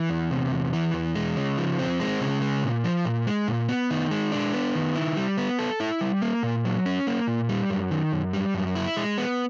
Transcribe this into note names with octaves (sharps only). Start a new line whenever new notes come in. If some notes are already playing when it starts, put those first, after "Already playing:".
Already playing: E3
E2
C3
E2
E3
E2
G#3
C#3
F3
C4
G#3
C#3
G#3
A#2
F3
A#2
G#3
A#2
B3
D#3
G#3
D4
B3
D#3
E4
G3
B3
A4
E4
G3
A#3
A#2
F#3
C#4
A#3
A#2
G3
F#2
D#3
F#2
G3
F#2
E4
G#3
B3